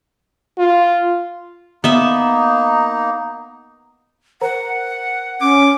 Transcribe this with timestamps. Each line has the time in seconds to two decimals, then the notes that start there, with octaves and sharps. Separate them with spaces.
0.58 F4
1.84 A#3 B3 D#4 E5
4.41 A#4 C5 F#5 A#5
5.41 C#4 D6